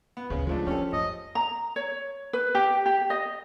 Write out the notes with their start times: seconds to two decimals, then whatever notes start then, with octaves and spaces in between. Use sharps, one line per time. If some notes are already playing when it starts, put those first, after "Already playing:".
0.17 B3
0.30 D2 C#3 E3 C#4
0.47 F3 G#3 A3 D4
0.67 E3 C#4 G4 A4
0.93 F#2 D#5
1.35 A#5
1.76 C#5
2.33 B4
2.55 G4
2.86 G4
3.10 D#5